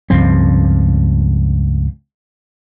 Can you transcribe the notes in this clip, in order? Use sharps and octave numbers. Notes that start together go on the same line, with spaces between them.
C#2 G2 F3 C4